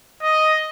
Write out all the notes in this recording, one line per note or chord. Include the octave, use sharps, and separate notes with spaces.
D#5